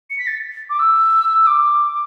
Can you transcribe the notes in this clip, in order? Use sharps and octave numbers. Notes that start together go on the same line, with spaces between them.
C#7
B6
A6
D6
E6
E6
D6